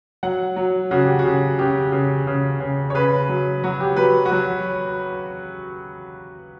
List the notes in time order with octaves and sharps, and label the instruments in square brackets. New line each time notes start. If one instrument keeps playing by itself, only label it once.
[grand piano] F#3 F#5
F#3
C#3 F#4
G4
F#4
C#3
C#3 G4
C#3
C#3
C#3
C#5
C#3 B4
F#3
F#3 F#4
G4
F#3 B4
F#4
F#3